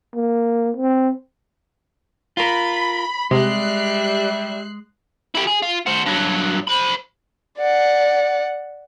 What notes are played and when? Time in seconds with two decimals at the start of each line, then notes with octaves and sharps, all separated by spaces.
0.15 A#3
0.77 C4
2.37 F4 A#4 B5
3.31 C3 G3 G#3 E5 F#6 C7
5.35 E4 G4
5.47 G#4
5.62 F4
5.86 F#4 C5
6.06 G2 F#3
6.68 C5 B5
7.58 D5 F#5